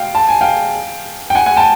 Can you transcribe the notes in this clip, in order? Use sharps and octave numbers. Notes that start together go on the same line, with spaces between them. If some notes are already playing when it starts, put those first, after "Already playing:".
Already playing: F5 G5
A5
G#5
F5 G5
G5
F#5 G#5
F#5 G#5
G5 A5